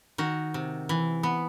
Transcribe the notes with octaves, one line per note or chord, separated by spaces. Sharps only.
D#3 F#4
C3
E3
B3